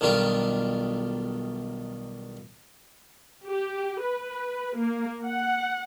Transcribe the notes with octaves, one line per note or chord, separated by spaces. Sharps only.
B1 D#3 G3 D4 F4
G4
B4
A#3
F#5